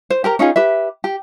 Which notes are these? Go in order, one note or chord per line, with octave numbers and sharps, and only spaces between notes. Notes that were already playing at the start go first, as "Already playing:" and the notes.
C5
G4 A#4 A#5
C#4 D#4 F4 G#4
G4 B4 E5
G4